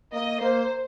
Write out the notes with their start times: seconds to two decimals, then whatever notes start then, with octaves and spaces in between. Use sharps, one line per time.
0.13 A#3 D#5
0.41 A#3 C5